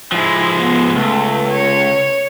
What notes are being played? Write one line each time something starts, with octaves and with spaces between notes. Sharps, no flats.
F3 G#3 E4
B3
C#2 A3
C#5